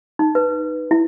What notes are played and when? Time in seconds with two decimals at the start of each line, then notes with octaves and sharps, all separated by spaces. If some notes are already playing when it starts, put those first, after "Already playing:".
0.19 D#4
0.35 B4
0.91 E4